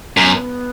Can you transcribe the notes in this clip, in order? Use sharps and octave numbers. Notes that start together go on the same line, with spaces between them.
F#2 B3